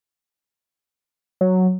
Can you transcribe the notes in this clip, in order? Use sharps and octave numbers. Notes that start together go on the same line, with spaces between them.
F#3